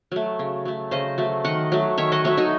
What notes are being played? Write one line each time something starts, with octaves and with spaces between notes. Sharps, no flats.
F#3 A3
C#3
F#3 A3
C#3 C5 D#5
F#3 A3
D#3 D#5 F#5
F#3 A3
D#3 C#5 E5
D#5 F#5
F#3 A3 C#5 E5
D#4 F#4